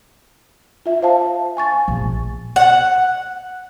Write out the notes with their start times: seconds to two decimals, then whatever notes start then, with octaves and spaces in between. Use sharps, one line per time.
0.86 F4 E5
1.02 C5 F5 A5
1.57 G#5 C#6 A6
1.88 A#1
2.56 F#5